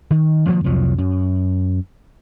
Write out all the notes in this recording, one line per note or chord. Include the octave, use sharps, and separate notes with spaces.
D#3
D#3 F3 A3 A#3
C2 F2 F3 F#3
F#2